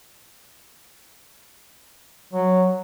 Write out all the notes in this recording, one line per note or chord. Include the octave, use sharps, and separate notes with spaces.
F#3